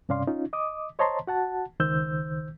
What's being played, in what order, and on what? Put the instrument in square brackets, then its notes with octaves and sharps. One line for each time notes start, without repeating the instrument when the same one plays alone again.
[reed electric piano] G2 C3 C#4 D5 F5 C6
C#4 D#4 F4
D#5 D6 D#6
C5 C#5 D#5 A5 A#5 C6
F#4 F#5 A5
C#2 D#3 C5 E6 G6